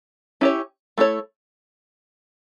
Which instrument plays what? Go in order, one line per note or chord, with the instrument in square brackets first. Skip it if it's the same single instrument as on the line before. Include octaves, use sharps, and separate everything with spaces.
[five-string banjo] C#4 E4 G4 C#5
A3 E4 A4 C#5